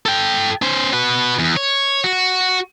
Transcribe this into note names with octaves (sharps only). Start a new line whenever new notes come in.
A4 G5
C#4 C5
F#4 B4
E2
C#5
F#4